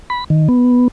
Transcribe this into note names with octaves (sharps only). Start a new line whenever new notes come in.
B5
D#3
B3